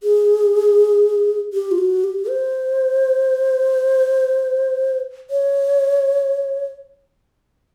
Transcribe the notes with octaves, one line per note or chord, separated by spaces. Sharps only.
G#4
G4
F4
F#4
G4
C5
C#5